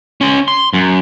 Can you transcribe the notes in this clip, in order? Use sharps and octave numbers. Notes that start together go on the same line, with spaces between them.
C#4 C6
C6
F#2